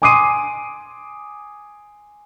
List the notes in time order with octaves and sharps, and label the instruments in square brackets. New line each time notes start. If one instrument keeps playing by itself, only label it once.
[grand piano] G#5 C6 D6 D#6 C7 D#7